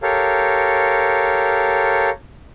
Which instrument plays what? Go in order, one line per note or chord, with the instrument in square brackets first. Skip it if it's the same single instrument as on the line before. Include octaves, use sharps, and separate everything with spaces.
[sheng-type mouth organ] G4 A4 A#4 C#5 F5